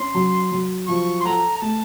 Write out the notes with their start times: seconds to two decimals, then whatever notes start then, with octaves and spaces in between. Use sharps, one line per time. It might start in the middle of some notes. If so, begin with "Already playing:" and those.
Already playing: C#4 C6
0.15 F#3
0.52 F#3
0.87 F3 C#6
1.21 C6
1.25 A4 F#5 A#5
1.56 A#5
1.61 A3 A5